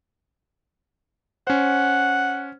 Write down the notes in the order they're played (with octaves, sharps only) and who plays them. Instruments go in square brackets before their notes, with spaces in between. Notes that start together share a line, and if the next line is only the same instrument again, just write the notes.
[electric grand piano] C#4 C5 [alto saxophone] F#5